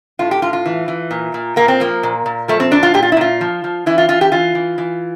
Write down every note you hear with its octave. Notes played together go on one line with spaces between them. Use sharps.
A2 F4
G4
A2 F4
F4
E3
E3
A#2
A#2
A#2 A#3
C4
F3 A#3
A#2
A#2
F3 A3
C4
A#2 D4
F4
A#2 G4
F4
E4
A#2 F4
F3
F3
E3 E4
F4
E3 F4
G4
E3 F4
E3
E3